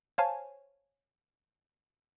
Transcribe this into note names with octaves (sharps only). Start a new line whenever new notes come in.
C5 C#5 F5 G#5 A5